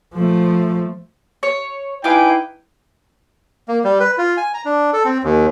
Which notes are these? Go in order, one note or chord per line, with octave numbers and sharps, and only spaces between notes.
F3 A3
C#5
D#4 E4 B4 F5 G5 G#5 D6
A#3
G3
B4
F4
G#5
A#5
D4
A4
C4
D#2